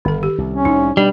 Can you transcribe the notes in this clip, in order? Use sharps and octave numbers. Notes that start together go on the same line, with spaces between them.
G1 D#3 A4
G4
C2
C#4
C2 A2 D#4
B2 G3 D4